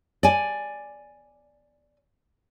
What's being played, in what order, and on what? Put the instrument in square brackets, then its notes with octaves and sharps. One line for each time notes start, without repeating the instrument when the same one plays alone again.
[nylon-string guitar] D5 G#5